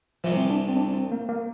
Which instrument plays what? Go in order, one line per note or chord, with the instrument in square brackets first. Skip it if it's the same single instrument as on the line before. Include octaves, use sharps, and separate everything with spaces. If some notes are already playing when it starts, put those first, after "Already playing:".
[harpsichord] C2 C3 E3 [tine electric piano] F3
[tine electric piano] C4
D4
C4
D4
C4
A#3
A#3